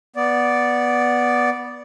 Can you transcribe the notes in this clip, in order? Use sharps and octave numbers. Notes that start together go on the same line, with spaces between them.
B3 D5